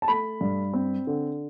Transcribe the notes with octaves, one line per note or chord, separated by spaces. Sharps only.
A5
A3 B5
G2
C4
D3